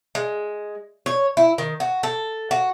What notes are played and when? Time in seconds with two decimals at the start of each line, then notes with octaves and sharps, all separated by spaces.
0.15 G#3
1.06 C#5
1.37 E4
1.58 D#3
1.80 F#4
2.03 A4
2.51 F#4